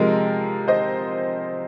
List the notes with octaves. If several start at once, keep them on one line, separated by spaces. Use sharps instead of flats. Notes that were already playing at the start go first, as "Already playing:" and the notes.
Already playing: C3 F3 G#3 A#4
C5 D#5